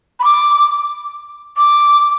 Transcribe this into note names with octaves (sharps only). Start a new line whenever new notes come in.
B5
D6
D6